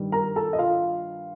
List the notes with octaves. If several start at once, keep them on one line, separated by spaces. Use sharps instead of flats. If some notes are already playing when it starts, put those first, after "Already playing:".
Already playing: G2 D#3 G3
A#4 A#5
A4 A5
D#5
F4 F5